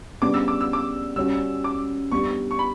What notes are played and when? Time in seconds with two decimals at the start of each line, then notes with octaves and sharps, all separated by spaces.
0.21 C#3 G3 B3 D4 D6
0.34 E6
0.48 D6
0.61 E6
0.73 D6
1.16 G3 C#4 F#4 E6
1.64 D6
2.12 G3 B3 D4 G4 C#6
2.51 C#6
2.59 B5